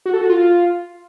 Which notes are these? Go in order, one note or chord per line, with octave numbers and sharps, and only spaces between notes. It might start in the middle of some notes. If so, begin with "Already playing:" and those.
F#4
A4
F#4
F4